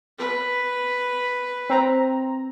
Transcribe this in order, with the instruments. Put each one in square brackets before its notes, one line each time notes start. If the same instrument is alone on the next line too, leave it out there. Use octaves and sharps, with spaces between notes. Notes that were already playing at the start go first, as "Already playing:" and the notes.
[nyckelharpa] B4
[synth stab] C4 A#5